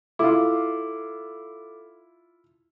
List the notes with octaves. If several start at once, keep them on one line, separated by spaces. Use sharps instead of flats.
E4 F4 A4 D6